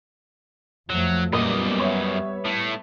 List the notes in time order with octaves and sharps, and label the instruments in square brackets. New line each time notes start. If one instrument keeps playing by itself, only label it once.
[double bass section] F2 F3 A3 [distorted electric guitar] F#3
[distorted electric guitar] F#2 D#5 [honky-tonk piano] A#2 [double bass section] G3 B3
[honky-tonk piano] C#5 E5
[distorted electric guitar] A2 A3